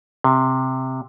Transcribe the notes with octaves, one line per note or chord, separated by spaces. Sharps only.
C3